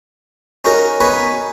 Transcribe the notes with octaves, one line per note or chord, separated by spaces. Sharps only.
C#4 D#4 F#4 A#4
B3 C#4 D#4 B4 C#5